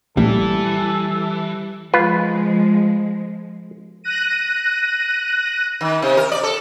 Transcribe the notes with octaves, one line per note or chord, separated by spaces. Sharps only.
A#1 E3 G3 A4
F3 G#3 F4 B4
F#6 A#6 D#7
D#3
C3
A#4
D5
A4